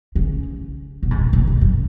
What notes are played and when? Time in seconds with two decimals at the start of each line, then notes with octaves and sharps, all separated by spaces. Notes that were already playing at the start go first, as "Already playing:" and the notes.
0.15 C#3
1.03 B2
1.11 G#2
1.18 A#2
1.33 B2
1.47 D#3
1.61 F#2